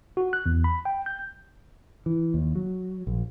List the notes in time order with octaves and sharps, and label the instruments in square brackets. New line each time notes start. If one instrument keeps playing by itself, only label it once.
[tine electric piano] F#4
F#6
E2
B5
G5
G6
[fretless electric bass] E3
D#2
F#3
A#1